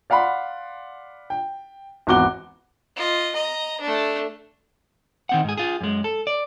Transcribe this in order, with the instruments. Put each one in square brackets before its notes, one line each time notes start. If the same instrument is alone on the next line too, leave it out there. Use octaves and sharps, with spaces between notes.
[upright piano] D5 F5 F#5 B5 C6
G5
G#1 E2 F#4 D6 G7
[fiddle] F4 D#5
D#5 A#5
A3 D4
[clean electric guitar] D#3 C4 F#5
G#2 G#4
F4 G#4
F#2 G#3
A4
D5